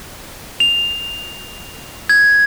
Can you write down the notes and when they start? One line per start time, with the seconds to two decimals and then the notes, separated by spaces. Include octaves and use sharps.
0.60 F7
2.09 G#6